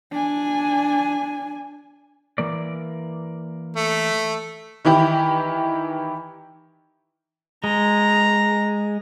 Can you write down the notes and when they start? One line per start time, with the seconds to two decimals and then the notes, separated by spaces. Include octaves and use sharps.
0.12 D4 G#5
2.38 E3 A#3 D5
3.76 A3
4.85 D#3 E3 E4 G4
7.64 G#3 A#5